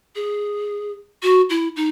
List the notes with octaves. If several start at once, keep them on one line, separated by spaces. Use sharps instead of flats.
G#4
F#4
E4
D#4